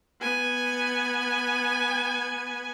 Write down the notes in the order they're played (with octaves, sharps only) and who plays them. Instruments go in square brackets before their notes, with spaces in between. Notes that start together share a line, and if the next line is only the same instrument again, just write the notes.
[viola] B3 G#5